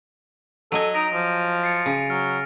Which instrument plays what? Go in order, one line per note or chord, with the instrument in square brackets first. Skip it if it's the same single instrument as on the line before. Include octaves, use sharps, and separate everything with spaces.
[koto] F#3 D#5 G#5 [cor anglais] A4 [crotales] D#7
[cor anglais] D#4 [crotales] A#6 D7 F7
[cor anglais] F3
[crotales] A6 C7 C#7
[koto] C#3
[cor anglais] F#3 [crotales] F6